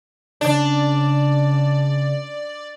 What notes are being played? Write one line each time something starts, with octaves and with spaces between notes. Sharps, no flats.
C#3 D4 D5